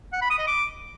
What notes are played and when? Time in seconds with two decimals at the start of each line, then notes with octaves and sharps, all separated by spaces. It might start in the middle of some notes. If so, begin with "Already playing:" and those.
0.13 F#5
0.22 B5
0.30 D#6
0.39 D#5
0.47 D6